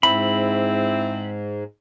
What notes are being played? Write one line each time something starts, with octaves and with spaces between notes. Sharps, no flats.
G#2 C4 E4 B5